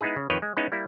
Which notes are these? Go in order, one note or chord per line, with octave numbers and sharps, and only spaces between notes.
G#3 B3 D#4 E4 G#4
C#3
F2 D#3 B4 C#5 D#5 G5
G#3
G#3 B3 C#4 D#4 E4
G3 A#3 E4